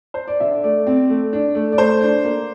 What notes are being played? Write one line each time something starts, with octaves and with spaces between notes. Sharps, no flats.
C5
D5
D3 E5
A3 D5
C4
A3
D4
A3
D5
A3 C5
D4
A#3